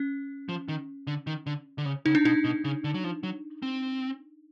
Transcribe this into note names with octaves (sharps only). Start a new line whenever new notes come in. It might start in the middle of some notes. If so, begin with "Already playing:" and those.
Already playing: C#4
F3
D#3
D3
D#3
D3
D3
C#3
C#3 D#4
D4
B2 D#4
B2
C#3
D3
F#3
F3
F#3
C4